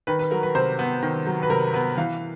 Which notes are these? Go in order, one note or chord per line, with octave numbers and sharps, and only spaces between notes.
D#3 B4
B4
F#3 A#4
B4
C3 C5
B3
D#3
F#3
B4
C3 A#4
B3 B4
E3 F5